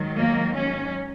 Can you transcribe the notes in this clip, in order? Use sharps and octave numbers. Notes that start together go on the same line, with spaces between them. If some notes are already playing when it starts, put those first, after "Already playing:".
Already playing: G#2 D#3 F#3
A#3
C#4